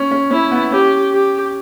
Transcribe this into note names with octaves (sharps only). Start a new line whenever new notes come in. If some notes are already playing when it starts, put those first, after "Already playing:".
Already playing: C#4
C#4
C#4 E4
B3
C#4 G4
G4